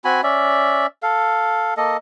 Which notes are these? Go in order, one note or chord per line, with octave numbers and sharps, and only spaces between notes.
C4 F#4 G#5 B5
C#4 D5 E5
A4 F5
A#3 A4 D#5